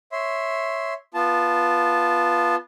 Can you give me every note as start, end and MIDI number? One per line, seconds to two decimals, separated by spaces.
0.12 0.94 73
0.12 0.94 76
0.12 0.94 84
1.14 2.56 59
1.14 2.56 65
1.14 2.56 81